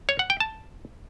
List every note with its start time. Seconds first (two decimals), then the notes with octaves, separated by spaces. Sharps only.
0.09 C#5
0.19 F#5
0.30 G5
0.40 A5